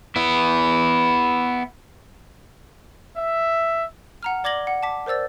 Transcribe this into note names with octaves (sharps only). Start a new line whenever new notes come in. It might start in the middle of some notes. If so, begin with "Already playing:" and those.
B3 E4
E5
F#5 A#5 F6
D5 D6 G#6 A#6 F#7 G7
F#5
A5 D6 B6
A#4 C5 D5 E6 A6